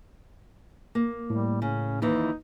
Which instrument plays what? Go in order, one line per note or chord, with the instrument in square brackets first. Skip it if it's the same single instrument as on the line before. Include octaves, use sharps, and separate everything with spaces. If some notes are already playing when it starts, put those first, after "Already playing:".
[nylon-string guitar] A#3
[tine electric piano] A2 [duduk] G3
[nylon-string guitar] C#3 [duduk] C#4
[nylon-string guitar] D#2 E3 [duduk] D#4